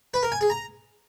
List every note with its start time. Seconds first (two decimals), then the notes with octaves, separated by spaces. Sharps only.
0.14 B4
0.23 A#4
0.32 G#5
0.41 G#4
0.50 A#5